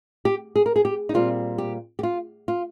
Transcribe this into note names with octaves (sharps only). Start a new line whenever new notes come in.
G4
G#4
A#4
G#4
G4
D#4
A#2 G3 C4 F4
G4
G4
F4
F4